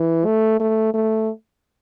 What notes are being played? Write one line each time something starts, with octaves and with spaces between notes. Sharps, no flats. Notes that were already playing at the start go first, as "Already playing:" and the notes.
Already playing: E3
A3
A3
A3